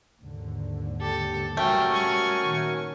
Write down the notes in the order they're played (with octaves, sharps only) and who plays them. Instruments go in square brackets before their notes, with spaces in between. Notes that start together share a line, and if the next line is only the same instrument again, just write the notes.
[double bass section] D#2 G#2 D3
[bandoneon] G4 [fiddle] A4
[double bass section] A#2 F#3 G3 [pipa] A3 [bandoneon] C#4 F#4 A#4 [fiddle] G5
[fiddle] G#5 C#6
[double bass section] A#2 D#3